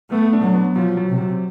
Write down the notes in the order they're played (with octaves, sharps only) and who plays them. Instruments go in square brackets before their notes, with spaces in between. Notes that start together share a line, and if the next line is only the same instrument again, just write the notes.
[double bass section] A3 [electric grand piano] B3
[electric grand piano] D4
[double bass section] F#3
[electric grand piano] B3
[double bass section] F3 [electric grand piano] F#3
[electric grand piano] F#3
[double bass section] C3
[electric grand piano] F#3